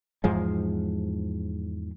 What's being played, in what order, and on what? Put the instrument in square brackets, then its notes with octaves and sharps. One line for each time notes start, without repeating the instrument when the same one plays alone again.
[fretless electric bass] E2 G#2 F3 G#3